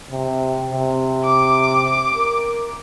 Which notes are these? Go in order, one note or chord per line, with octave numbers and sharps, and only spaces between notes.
C3
C3
D6
A#4